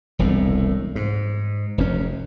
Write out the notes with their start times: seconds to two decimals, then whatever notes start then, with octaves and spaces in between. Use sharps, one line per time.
0.19 E1 C2 A2
0.95 G#2
1.78 F1 F#2 C#4